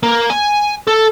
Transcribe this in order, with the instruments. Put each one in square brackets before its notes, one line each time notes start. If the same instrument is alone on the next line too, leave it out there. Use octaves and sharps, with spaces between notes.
[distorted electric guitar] A#3
G#5
A4